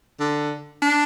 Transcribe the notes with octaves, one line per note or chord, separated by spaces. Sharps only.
D3
D4